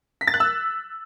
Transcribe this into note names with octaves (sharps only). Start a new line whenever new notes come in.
B6
A6
F#6
E6